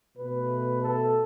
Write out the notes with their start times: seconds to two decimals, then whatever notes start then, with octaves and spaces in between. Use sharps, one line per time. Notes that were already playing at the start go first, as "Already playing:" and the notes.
0.18 B2 A3 B4
0.82 A4